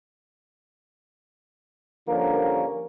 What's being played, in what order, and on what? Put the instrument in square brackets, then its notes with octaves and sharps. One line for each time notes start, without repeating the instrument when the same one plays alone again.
[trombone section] G2 D3 F3 A#3 C#4 A#4